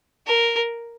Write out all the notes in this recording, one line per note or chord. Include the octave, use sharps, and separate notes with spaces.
A#4